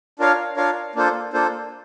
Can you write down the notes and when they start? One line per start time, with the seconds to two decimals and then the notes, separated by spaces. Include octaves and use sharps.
0.19 D4 F4 A#4 C#5 F5
0.56 D4 F4 A#4 C#5 F5
0.95 A#3 D4 F4 A4 C5
1.33 A#3 D4 F4 A4 C5